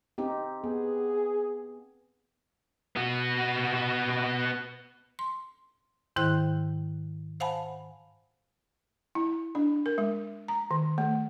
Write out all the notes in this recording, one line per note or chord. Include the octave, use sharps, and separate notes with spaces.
C4 D#4 G4
B3 G#4
B3 F#4
C6
G#2 D#3 E4 C5 G5 F#6
C5 F5 F#5 G#5 A5 B5
E4
D4
A#4
G#3
A#5
D#3
A3